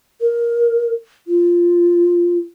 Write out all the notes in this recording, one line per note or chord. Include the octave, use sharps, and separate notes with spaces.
A#4
F4